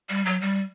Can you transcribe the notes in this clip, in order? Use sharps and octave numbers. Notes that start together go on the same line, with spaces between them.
G3
F#3
G3